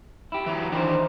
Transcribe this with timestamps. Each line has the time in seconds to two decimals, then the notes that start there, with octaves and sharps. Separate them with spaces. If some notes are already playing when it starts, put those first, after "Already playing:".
0.32 E4 G4
0.46 E3 F#3
0.72 D#3 E3 D4 A#4 C5